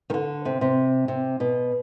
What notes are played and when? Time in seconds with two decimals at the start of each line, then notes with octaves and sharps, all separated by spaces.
0.10 D#3
0.14 D3
0.45 C3
0.61 C3
1.08 C3
1.40 B2